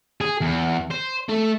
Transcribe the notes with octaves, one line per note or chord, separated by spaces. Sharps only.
G#4
E2
C5
A3